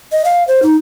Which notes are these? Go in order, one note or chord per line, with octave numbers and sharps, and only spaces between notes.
D#5
F5
C5
D#4